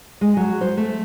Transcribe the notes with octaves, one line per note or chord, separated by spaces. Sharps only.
G#3
F#3
C5
A3